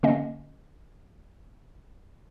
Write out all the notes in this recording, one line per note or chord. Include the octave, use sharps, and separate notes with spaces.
D3 A#3 C#4 D#5